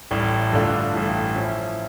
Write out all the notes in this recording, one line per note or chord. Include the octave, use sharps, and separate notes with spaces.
A1 A2 G3
G2 D3 A3 D4 F4
A1 G2 E3
A2 F3 C#4 E4